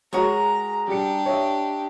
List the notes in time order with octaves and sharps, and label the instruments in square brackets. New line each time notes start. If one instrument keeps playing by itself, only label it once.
[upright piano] G#3 C#5 [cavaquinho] F#4 G#4 A#4 [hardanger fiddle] A#5
[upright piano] G3 C#7 [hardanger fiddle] D4 G4
[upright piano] C#5 D#5 E5